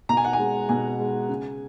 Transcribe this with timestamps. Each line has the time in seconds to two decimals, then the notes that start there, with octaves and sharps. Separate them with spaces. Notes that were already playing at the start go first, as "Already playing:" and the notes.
0.09 B2 A#5
0.17 G#5
0.25 F#5
0.33 G#5
0.39 G#3
0.69 B2 G#5
0.99 G#3
1.29 C#3